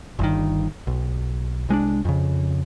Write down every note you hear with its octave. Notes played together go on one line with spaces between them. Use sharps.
G1 G2 D#3
B1
C2 G#3 C#4 D4
F2 C#3